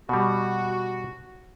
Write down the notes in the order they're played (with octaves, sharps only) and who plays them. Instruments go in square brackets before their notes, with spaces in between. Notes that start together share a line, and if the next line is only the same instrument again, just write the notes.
[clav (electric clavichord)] B2 G3 [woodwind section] F#4